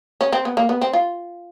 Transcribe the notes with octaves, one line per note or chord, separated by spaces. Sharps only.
C#4
C4
B3
A#3
B3
C4
F4